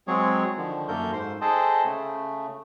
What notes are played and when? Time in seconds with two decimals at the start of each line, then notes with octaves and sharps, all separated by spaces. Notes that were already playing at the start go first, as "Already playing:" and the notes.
0.07 F#3 G#3 C4 G#4 C#5
0.58 D3 D#3 F3
0.88 F#2 A3 A#3 A4 A#4 G6
1.13 G#2 C5 C6
1.41 G#4 A4 C5 D#5 G5 A5
1.85 C#3 A3